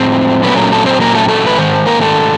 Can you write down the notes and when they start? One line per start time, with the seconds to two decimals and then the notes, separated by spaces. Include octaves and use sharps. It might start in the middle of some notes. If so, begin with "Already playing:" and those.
Already playing: A2 F3 G#3 C4 C5
0.43 A#2 F#3 A3 B3 C#4 B4
0.57 A#3 A#4
0.72 A3 A4
0.86 C4 C5
1.00 A#3 A#4
1.14 A3 A4
1.28 A3 A4
1.46 B4
1.58 G#2 D#3 C5
1.86 A#3 A#4
2.01 A3 A4